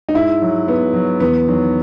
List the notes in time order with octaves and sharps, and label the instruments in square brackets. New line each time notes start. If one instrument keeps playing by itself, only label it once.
[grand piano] D#4
G#2 E4
F#3
G#2 B3
F#3
E2 B3
D#3 F#3